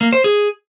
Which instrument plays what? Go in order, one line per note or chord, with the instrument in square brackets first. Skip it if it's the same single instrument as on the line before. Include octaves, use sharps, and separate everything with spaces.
[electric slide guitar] A#3
C5
G#4